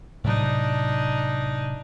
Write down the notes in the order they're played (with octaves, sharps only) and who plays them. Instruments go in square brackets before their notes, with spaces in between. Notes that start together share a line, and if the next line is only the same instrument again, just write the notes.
[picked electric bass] A2 C3 F#3 [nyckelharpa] D4 D#4